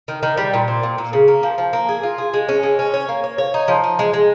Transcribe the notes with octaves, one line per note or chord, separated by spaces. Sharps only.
D#3
D#3
G3
A#2
C4
A#2
A#2
C#3
A#3
F3
F3
A#3
G#4
F4
G#4
G#3
C#4
G#3
C#4
C#5
A#3
C#5
C#5
D#4
F3
D#4
G#3
G#3